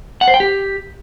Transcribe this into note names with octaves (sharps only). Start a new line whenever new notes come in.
F#5
C5
G5
G4